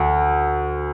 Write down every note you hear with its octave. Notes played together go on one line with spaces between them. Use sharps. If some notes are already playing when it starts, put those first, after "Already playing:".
Already playing: D2